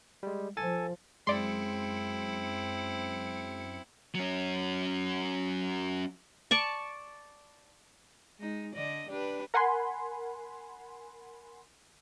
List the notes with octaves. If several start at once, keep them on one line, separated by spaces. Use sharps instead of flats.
G3 G#3
F3 A4 G#5 A6
F#2 G#3 C4 E4 D5 C6 C#7
F#3 C#4
D5 A5 C#6
G#3 D#4
D3 D5 D#5
D4 G4 B4
A#4 F#5 G#5 B5 C6